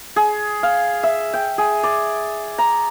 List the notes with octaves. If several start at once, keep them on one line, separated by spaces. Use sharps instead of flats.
G#4
F5
E5
G5
G#4
D5
A#5